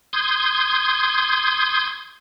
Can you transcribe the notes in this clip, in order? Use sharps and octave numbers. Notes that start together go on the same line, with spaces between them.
C6 D#6 G6 G#6